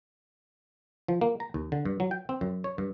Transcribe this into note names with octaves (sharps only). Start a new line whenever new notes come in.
F3
A#3
A#5
D#2
D3
G2
F#3
G5
C4
F#2
C#5
G2